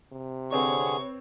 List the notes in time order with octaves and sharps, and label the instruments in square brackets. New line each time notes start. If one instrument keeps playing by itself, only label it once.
[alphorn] C3
[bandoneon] D3 G#4 [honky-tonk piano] C4 B4 C#5 [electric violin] C#6